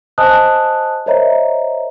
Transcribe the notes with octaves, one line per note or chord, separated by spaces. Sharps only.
C5 D#5 G#5 A5 D#6 F#6
A#4 C5 C#5 D#5 E5 A#5